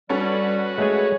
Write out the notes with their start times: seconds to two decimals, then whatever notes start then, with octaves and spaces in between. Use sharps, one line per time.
0.09 G3 C#4 F#4 A4 B4
0.78 G#3 A3 G#4 C#5